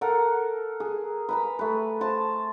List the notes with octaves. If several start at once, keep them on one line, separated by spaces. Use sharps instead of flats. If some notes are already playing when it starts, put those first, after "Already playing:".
A4 A#4 F#5
G#4
B4 A#5 B5
A3 B4
C5 A5